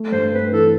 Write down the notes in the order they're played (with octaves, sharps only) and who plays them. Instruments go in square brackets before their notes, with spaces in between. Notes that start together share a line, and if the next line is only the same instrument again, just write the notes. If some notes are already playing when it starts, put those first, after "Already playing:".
Already playing: [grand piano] A3
[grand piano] G2 [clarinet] C5
[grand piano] C4 [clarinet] B4
[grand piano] E3 [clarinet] A4